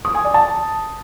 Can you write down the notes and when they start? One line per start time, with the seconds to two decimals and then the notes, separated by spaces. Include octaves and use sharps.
0.05 D#6
0.15 G#5
0.24 D5
0.34 A5